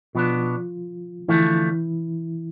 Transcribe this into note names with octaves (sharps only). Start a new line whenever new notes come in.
B2 F3 B3 D4 F4
D3 E3 F3 A3 E4